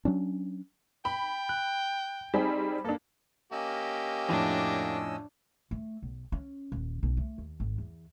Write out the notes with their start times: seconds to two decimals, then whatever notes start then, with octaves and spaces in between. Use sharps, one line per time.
0.05 F#3 C#4 D4
1.05 G5 B5
1.49 F#6
2.34 G3 C4 D#4 G#4
2.84 A#3 D4 A4
3.52 A#3 C#4 G4 D#5 E6
4.29 F2 A2 D4
5.71 A3
6.03 B1
6.32 C#4
6.72 D#1
7.03 B1
7.17 A3
7.38 D#2
7.60 G#1
7.78 E2